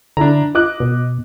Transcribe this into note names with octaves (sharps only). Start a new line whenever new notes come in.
D3 D4 E4 A#5
F4 D#5 D6 F#6
B2